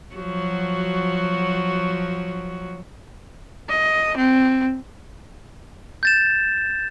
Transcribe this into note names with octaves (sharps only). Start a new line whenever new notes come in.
F3 F#3 F#4
D#5
C4
G6 A6 E7